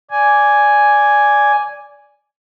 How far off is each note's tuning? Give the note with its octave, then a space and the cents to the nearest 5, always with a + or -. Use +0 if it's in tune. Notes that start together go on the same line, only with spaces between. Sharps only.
D5 -10 G#5 +0